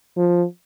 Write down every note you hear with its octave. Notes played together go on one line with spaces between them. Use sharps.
F3